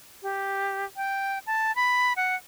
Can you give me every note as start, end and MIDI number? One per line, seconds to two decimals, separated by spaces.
0.23 0.85 67
0.97 1.39 79
1.47 1.74 81
1.76 2.13 83
2.17 2.36 78